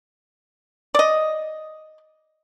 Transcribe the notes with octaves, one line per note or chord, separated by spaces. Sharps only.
D5 D#5